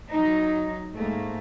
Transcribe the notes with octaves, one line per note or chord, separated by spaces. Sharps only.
F#3 D#4
G#2 A3 A#3